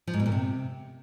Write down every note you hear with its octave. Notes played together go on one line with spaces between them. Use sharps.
F3
G#2
B2
A#2
C3